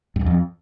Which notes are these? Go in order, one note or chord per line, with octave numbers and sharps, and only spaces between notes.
G2
E2
F2